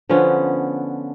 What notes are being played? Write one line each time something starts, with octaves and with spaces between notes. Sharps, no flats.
D3 F3 B3 C#4